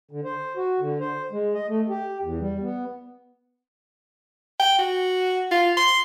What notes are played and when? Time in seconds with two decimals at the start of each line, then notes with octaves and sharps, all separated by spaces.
0.11 D3
0.24 C5
0.57 F#4
0.80 D3
1.00 C5
1.32 G#3
1.54 D#5
1.68 A3
1.89 G4
2.23 E2
2.40 G3
2.62 B3
4.60 G5
4.79 F#4
5.52 F4
5.77 C6